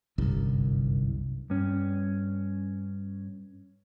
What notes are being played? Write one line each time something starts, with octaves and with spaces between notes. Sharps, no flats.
G1 C2 F#2
G2 C#4